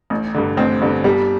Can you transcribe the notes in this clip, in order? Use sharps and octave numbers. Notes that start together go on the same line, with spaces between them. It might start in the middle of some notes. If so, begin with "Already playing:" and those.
A1
G2 D3
A1 C4
G2 D3
G1 G3